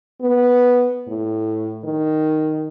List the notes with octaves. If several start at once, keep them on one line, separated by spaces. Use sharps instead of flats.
B3
A2
D#3